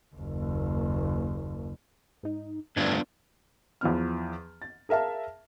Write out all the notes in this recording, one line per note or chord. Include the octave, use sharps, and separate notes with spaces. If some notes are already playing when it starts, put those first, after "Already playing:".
F#1 D#2
G#2 D#4
D2 G2 B3 D4 F4 G#6
E2 F3 B3 F6
A6
G#4 A#4 E5 F5 A5